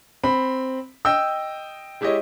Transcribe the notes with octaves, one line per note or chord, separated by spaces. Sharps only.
C4 B5
D#5 G5 E6
G#3 E4 G4 C#5 D#5